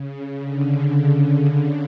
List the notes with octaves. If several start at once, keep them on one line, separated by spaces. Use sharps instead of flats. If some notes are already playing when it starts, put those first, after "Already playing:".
Already playing: C#3
D3